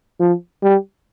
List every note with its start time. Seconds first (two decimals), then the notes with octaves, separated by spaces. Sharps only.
0.20 F3
0.63 G3